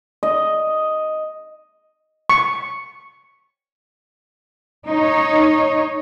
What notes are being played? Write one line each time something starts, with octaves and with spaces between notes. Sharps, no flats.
D#5
C#6
D#4 C#5